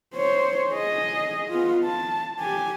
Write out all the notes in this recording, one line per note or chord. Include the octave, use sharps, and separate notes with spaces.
C5 C#5
G#4 D#5
B3 F4
A5
G4 G#5